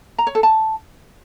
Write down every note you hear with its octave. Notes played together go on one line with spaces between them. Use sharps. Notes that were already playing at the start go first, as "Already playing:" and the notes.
A#5
C#5
A4
A5